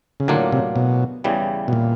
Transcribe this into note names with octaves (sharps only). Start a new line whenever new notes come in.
C#3
A2 D3 F#3 A#3 D4 F4
C3
B2
E2 C#3 E3 G3
B2
A#2